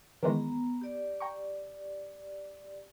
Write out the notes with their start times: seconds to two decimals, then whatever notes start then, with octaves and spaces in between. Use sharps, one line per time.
0.23 D#3 E3 G#3 B3 A#5
0.81 G4 D5
1.20 G5 A#5 C#6